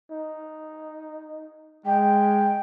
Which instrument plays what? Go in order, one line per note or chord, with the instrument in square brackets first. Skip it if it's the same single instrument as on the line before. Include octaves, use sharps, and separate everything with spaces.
[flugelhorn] D#4
[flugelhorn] G#3 [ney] G5